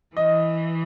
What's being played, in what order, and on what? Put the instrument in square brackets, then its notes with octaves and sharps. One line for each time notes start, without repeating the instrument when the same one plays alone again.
[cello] E3 [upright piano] D#5